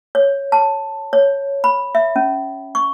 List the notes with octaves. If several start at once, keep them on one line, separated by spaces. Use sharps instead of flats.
C#5
A5
C#5
B5
E5
C#4
C#6